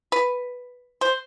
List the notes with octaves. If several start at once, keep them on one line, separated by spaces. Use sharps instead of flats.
B4
C5